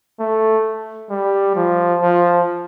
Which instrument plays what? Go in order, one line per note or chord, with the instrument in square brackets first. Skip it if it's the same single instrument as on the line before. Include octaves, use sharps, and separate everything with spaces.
[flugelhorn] A3
G3
F3
F3